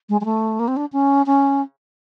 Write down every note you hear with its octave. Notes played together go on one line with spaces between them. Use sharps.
G#3
G#3
A3
A#3
C4
D4
C#4
C#4